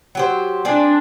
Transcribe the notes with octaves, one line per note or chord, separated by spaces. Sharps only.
F#3 G4 C5
C4 D4 G#4 D5